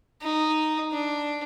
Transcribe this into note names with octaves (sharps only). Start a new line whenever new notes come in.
D#4
D4